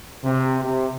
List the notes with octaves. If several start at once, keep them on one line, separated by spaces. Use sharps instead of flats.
C3
C3